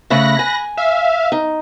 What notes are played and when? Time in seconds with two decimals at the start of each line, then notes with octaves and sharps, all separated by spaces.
0.10 C#3 A3 B5 F#6 A#6
0.39 G#5
0.77 E5 F5
1.32 D#4